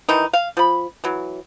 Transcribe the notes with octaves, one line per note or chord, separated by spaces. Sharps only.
D#3 E3 D#4
F5
F3 B5
E3 F#3